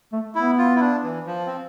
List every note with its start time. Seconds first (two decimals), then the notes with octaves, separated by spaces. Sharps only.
0.13 A3
0.35 B3 E4
0.58 F4
0.76 E4
0.81 D4
1.04 E3
1.26 F3
1.47 C4